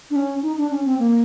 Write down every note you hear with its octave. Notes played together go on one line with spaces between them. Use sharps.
D4
C#4
D#4
D4
C#4
C4
A#3